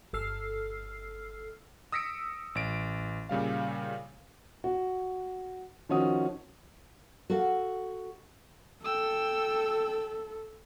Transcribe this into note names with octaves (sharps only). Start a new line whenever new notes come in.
G1 A4 E6 F6 C7
D#6 E6 A#6 B6 C#7 D7
A1 D7
A#2 C#3 G3 F5
F#4
D#3 F3 C#4 F#4 D#6
F#4 A4 F5 F#5
A4 G5 E6